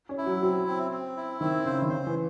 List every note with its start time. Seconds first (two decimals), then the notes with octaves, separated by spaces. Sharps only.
0.09 C#4
0.18 E4
0.26 F#3
0.42 F#3 C4
0.67 C4
0.91 C4
1.17 E4
1.41 D#3 C4
1.65 C#3 C5
1.82 D#3
1.90 C#3 C5
2.07 E3